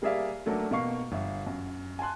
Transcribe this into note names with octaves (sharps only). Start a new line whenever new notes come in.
G3 A#3 G#4 D5 E5 F5
F#3 A3 A#3 D4
B2 A#3 F5 C#6 C7
G1 E5
F#2
G#5 A5 C6 F#6